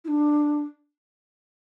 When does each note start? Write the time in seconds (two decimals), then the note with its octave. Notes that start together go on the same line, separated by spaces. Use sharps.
0.04 E4
0.08 D4